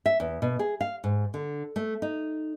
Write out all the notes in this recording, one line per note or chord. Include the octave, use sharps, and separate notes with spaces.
E5
E2
B2
G#4
F5
G#2
D3
A3
D#4